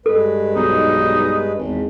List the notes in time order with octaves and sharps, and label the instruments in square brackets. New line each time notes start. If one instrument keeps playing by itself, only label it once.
[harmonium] G2 G#3 B4 [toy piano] A4
[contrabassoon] B1 [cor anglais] D#4
[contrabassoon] G#1 [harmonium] E2